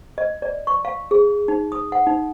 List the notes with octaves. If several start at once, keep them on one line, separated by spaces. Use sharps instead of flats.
D#5
D5
C#6
F5
G#4
D#4
D#6
F#5
D#4